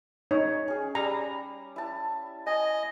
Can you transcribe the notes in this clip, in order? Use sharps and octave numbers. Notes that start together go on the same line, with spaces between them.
D#4 C#5
C#4 G#4
G3 A#5
E4 A5
D#5 G#5